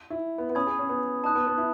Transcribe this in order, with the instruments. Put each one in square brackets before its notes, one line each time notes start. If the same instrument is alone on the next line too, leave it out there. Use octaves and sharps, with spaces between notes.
[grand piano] E4
B3
B3
[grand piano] C#4 [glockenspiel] B5 D#6 G#6
[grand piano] G#4
C#4
B3
[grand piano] D#4 [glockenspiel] A5 D#6 F#6
[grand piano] B3
B3
E4